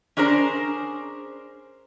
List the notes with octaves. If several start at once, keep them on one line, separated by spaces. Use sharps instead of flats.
C#4 D4 G#4 A#4 C5